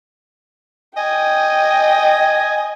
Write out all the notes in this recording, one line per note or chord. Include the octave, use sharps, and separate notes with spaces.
D#5 G5 G#5